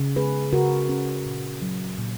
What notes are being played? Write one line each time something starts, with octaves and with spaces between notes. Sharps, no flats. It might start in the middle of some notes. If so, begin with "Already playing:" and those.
Already playing: C#3
G#3 G#4 B4
C#3 F#4 A#4
C#4
A#2
F#3
A#2